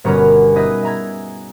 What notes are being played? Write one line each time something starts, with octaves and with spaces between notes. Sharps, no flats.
G1 B2 C#4 A#4 B4 A#5
D#4 G#4 B4 D#5 E5
E5 A#5 G#6